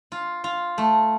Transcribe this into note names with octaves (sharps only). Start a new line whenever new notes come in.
F4
F4
A3